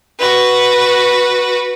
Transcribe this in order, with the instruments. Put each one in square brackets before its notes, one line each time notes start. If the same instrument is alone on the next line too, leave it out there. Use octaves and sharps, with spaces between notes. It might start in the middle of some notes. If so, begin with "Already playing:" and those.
[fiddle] F#4 B4